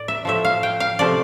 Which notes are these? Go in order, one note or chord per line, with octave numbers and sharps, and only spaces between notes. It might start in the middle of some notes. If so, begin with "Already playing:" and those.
Already playing: A2 D5
E5
A2 F3 A3 E5
F5
G5
F5
C3 F3 A3 D5